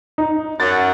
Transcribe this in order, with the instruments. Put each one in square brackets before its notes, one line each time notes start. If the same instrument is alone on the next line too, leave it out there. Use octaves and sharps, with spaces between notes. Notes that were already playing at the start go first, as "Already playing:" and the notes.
[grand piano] D#4
[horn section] F#2 F#5 [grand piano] A6